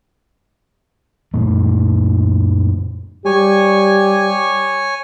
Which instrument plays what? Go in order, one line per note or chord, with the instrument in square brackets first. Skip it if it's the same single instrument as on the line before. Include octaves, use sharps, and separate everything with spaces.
[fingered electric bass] F#2 A#2 A3
[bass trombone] G3 [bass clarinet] G4 [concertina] C#5 G#5